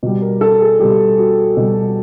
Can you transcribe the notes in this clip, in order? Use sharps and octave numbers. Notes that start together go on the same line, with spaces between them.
B2 G3
A#4
A4
G#4
B2 G3 G4
F#4
B2 G3